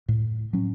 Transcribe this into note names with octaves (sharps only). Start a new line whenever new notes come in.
A2
F#3 C#4